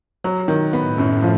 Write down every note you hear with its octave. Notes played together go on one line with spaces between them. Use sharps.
F#3
D#3
A2 B3
F#2
F3